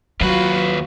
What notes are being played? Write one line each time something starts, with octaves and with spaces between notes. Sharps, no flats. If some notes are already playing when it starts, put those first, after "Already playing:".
D#2 F#3 F4 F#4 B4